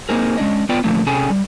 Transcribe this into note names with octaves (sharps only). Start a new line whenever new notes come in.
A#3 C4 D#4 G#4 A#4
G#3 C#4 D4 D#5
B3 F4 B4 D5 G5
A#2 D3 F3 A3 A#3
C3 C#4 G#4 A4 G5 G#5
G3